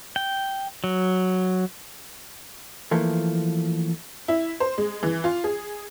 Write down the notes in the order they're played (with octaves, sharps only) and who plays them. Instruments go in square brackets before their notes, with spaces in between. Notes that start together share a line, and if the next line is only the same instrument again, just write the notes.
[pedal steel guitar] G5
F#3
[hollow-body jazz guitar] E3 F3 A3 A#3
[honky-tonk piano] E4
C5
G#3
E3
F4
G#4